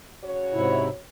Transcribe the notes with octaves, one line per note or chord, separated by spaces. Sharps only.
C#3 F#4 C#5
G#2 C3 E4